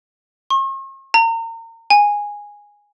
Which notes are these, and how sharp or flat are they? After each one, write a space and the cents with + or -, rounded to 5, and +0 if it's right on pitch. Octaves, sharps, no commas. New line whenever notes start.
C#6 -45
A#5 -35
G#5 -10